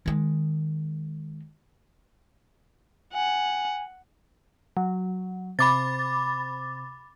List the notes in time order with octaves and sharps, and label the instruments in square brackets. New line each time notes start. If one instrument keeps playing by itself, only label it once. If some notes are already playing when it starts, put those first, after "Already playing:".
[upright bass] D#3 G#3
[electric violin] F#5 [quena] G#5
[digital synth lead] F#3
[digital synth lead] C3 [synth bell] B5 D6 A6